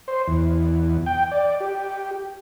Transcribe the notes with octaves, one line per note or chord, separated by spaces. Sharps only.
C5
E2
G5
D5
G4